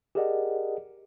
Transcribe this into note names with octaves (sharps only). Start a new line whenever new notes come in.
G4 G#4 A#4 D5 D#5 F#5